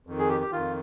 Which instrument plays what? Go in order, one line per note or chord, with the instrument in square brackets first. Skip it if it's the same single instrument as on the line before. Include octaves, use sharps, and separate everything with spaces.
[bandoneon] F2 D#3
G#4
G4
G4
F2 D#3 F4